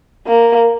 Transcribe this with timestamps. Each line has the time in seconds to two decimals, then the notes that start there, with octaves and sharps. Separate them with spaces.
0.27 A#3